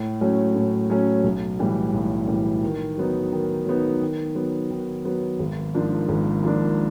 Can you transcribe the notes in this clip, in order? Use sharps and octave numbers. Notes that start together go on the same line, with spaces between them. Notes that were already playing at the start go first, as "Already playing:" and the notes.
Already playing: A2
F#3 A3 C#4
A2
F#3 A3 C#4
B1
A2 E3 G3
B1
A2 E3 G3
D#3
F#3 B3 D#4
D#3
F#3 B3 D#4
D#3
F#3 B3
D#3
F#3 B3
G#1
G#2 F3 A#3 D4
G#1
G#2 F3 A#3 D4